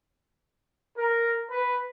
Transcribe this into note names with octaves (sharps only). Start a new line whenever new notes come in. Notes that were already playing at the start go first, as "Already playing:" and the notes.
A#4
B4